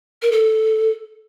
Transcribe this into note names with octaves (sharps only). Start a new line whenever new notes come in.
A#4
A4